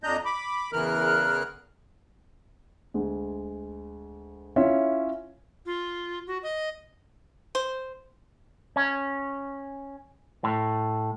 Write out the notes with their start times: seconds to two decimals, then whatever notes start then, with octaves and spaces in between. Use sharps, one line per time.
0.04 F2 D4 D#5 A#5 G6
0.25 B5 D6
0.73 E2 C#3 E3 A#4 F6 F#6
2.94 D2 G#3
4.56 C#4 E4 F4 C#5 E5
5.66 F4
6.27 F#4
6.43 D#5
7.55 C5
8.76 C#4
10.44 A2